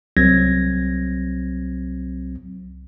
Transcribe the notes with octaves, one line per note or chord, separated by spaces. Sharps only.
C2 F#3 C4 G#6 A#6